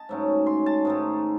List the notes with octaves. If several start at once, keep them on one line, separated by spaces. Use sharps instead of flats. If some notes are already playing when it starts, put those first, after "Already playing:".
Already playing: D#5 A5
G#2 F#3 A3 C#4
C6
A5
G#2 D#3 A3